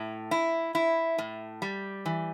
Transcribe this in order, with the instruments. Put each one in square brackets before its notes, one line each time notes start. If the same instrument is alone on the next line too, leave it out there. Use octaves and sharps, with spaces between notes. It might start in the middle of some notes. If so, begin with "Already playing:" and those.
Already playing: [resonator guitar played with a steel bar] A2
E4
E4
A2
G3
E3